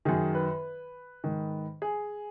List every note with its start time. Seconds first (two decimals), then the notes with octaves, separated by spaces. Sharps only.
0.05 F#2 D#3 G#4
0.35 B4
1.24 G#2 D#3
1.82 G#4